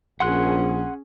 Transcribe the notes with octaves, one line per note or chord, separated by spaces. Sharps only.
A#1 C#4 G#4 F#5 C6 F#6